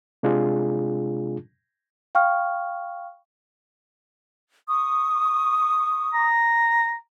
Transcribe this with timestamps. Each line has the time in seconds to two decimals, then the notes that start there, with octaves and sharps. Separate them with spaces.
0.23 C3 G#3 D4 F4 G#4
2.15 F5 G5 C#6 F6
4.67 C#6 D#6
6.14 A#5